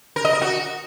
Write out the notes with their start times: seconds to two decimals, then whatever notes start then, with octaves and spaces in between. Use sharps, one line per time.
0.16 A#4
0.25 D#5
0.33 A#4
0.42 F#4